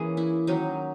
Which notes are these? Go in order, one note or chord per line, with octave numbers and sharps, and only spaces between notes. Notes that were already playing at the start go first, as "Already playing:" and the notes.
Already playing: E3 A#3 C#4 G#4
E4
D#3 F#3 C#4 D#4